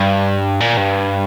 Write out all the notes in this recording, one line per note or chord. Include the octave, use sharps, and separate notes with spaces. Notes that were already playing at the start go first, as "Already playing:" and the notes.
Already playing: G2
A#2
G2